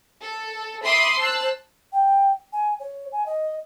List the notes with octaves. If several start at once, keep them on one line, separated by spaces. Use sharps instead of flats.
A4
E5 B5 C6 D6 D#6
C5 A5 E6 F#6
G5
G#5
C#5
G#5
D#5